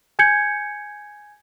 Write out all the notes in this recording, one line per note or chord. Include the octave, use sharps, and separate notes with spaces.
G#5 G6 G#6 C#7